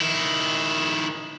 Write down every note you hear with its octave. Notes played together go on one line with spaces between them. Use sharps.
D#3 E4